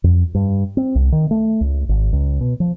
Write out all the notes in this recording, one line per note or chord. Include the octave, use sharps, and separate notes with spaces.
F2
G2
C4
C2
D#3
A3
C#2
G#1
C#2
B2
F3